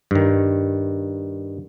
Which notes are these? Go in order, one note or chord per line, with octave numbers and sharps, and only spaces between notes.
G2 D#3